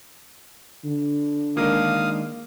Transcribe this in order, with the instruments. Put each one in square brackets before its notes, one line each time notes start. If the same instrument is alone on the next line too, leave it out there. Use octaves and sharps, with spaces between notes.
[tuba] D3
[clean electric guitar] D#3 G#3 D4 [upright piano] A#3 [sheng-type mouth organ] F5 D#6